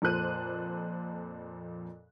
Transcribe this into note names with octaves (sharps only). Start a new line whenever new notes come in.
F2 A#2 A4 C5 F#6 D#7